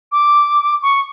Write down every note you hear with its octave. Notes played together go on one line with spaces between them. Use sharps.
D6
C#6